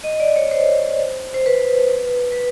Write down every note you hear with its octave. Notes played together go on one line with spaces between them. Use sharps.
D#5
D5
C#5
C5
C5
B4
B4